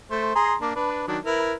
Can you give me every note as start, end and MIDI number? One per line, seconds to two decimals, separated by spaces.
0.11 0.34 57
0.11 0.34 72
0.35 0.54 68
0.35 0.54 82
0.35 0.54 84
0.61 0.71 58
0.61 0.71 62
0.76 1.06 62
0.76 1.06 71
1.08 1.18 51
1.08 1.18 54
1.08 1.18 62
1.25 1.53 64
1.25 1.53 70
1.25 1.53 71